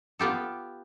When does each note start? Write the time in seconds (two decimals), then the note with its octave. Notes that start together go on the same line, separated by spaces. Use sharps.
0.19 B3 F4 G4 A4